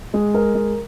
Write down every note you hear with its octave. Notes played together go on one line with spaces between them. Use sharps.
G#3
A#4
G#3